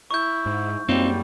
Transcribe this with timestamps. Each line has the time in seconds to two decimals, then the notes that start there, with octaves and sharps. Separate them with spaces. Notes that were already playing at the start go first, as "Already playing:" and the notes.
0.11 E4 C#6 G6
0.46 G#2
0.89 F#2 G3 A#3 C4 D#4 F4